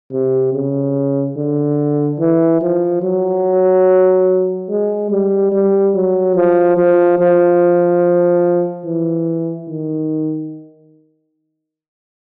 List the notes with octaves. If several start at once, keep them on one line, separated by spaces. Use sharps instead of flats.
C3
C#3
D3
E3
F3
F#3
G#3
G3
G3
F#3
F3
F3
F3
E3
D#3